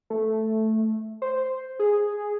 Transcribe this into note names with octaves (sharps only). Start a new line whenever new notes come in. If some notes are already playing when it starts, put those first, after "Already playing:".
A3
C5
G#4